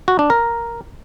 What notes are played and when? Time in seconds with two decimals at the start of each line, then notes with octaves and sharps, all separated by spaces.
0.08 F#4
0.19 D4
0.30 A#4